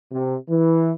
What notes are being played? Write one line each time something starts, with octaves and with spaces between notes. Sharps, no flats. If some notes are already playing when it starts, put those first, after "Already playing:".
C3
E3